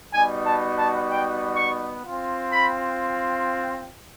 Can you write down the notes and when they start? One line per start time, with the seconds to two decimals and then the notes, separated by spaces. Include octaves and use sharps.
0.13 G3 B3 D#4 F#4 G#5
0.46 A5
0.77 A5
1.09 G5
1.56 C#6
2.04 C4 F4
2.51 B5